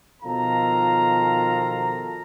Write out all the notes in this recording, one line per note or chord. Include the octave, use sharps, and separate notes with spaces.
B2 D#3 F3 A4 F5 A#5